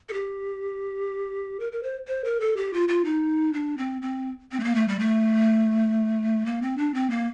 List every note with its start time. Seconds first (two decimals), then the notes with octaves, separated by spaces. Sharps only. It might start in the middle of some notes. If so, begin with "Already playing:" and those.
0.09 A4
0.13 G4
1.60 A#4
1.72 A#4
1.83 C5
2.07 C5
2.24 A#4
2.40 A4
2.57 G4
2.73 F4
2.88 F4
3.05 D#4
3.53 D4
3.78 C4
4.02 C4
4.52 C4
4.60 A3
4.64 A#3
4.75 A3
4.88 G3
4.99 A3
6.46 A#3
6.62 C4
6.78 D4
6.94 C4
7.10 A#3